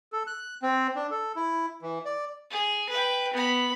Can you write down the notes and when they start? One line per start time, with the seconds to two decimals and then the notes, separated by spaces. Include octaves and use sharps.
0.13 A4
0.27 F#6
0.62 C4
0.96 D4
1.11 A4
1.36 E4
1.82 E3
2.05 D5
2.51 G#4
2.89 B4 G5
3.34 B3 B5